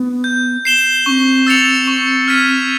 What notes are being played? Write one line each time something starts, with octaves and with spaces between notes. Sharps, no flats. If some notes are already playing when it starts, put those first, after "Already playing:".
Already playing: B3
G6
C7 E7 G7
C4 C#4 C#6
E6 A6 C#7 F7
C#6
F6 G#6 B6 D#7